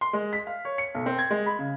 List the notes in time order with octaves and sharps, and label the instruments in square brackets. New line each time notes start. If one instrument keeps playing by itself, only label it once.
[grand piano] C6
G#3
B6
F5
C#5
C#7
B1
C4
G#6
G#3
B5
C#3